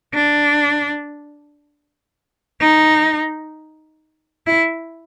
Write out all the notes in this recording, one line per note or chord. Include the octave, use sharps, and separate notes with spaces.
D4
D#4
E4